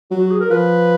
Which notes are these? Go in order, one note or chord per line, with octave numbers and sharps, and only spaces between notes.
F#3 F#4
F#4
G#4
A#4
F3 B4